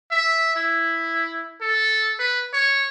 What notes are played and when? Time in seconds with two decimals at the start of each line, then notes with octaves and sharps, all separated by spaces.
0.11 E5
0.56 E4
1.61 A4
2.19 B4
2.53 C#5